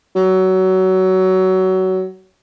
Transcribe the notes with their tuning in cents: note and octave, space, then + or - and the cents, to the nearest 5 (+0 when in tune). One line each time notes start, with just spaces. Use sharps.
F#3 +20